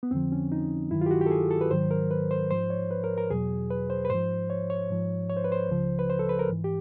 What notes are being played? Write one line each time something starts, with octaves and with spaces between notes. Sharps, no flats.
B3
F2 D3 F3 C4
C#4
D#4
G2 D#3 F#3 E4
F4 G4
F#4
G4
A4
G#4
A4
B4
G#2 D#3 F#3 C5
A#4
B4
C5
G#2 F3 C5
C#5
B4
A#4
A#4
E2 B2 F#3 G#4
B4
C5
B4
G#2 F3 C5
C#5
C#5
G#2 F3
C#5
C5
B4
C5
C#2 C#3 F3
B4
C5
A4
B4
A#4
G#2 E3
G4